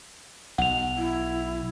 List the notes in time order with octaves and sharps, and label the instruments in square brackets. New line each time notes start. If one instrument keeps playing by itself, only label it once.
[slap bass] B1 [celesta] F#5 F7
[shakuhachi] E4